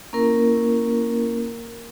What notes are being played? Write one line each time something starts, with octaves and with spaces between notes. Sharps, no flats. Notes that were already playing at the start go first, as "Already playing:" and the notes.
A#3 C#4 E4 A#4